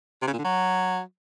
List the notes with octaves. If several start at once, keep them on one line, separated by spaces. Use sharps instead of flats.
C3
C#3
A#2
D3
F#3